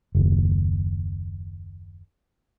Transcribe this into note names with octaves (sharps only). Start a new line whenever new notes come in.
F#1 D#2